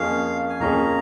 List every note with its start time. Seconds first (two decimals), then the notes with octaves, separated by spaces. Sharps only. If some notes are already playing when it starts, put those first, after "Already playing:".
Already playing: F2 F3 A#3 C#4 G#4 F5
0.50 G#5
0.60 F2 F3 A#3 C#4 G#4 A#5